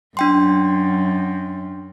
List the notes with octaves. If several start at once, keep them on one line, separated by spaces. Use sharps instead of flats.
F#2 D4 G5 C6